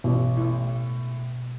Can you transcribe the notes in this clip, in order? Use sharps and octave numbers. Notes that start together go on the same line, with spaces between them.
A1 B2
A2